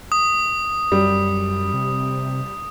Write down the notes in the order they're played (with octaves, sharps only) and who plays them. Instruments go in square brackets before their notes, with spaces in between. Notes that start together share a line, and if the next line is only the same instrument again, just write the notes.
[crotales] D#6
[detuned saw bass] F#2 [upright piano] G3
[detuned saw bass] C3